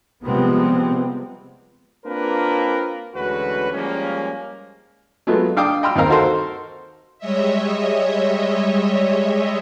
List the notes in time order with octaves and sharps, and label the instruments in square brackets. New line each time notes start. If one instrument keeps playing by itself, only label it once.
[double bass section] C3 F3 G3 G#3 B3 C4
[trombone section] A#3 C4 D4 F4 A#4 B4
D2 E3 G#3 C#4 F#4 B4
F3 G3 G#3 A#3 C#4
[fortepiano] F#3 G#3 A3 B3 F4
D4 F5 G5 D6 D#6
D#5 G5 B5 C6 E6 F6
D#2 C4 D#4 A#4 F5 A#5
D#4 F#4 A4 A#4 C5 C6
[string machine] G3 G#3 C#5 D#5 E5